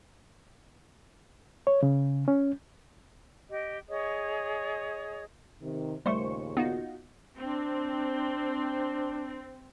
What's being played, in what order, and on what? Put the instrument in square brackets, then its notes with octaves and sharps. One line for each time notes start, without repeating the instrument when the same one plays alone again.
[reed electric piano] C#5
C#3
C#4
[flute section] G4 D#5
G#4 C#5 D#5 D#6
[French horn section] C3 D#3
[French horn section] D#2 A#2 C#3 [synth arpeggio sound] G3 A3 [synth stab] C5 C#6
[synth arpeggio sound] B3 [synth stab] D#4 F4 F#4
[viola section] C4 [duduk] D4